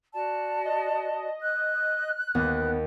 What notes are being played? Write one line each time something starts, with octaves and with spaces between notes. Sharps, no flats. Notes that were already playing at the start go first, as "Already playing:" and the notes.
F#4 D5 A5
D#5
F#6
D#2 B3